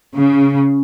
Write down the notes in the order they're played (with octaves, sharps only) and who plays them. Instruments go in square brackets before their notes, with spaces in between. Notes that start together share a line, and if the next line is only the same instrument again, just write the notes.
[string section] C#3